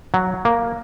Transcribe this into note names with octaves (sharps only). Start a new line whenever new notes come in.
F#3
A#3